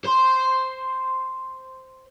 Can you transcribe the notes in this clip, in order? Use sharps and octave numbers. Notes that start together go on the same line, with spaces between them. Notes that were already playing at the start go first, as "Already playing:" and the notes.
C5 C6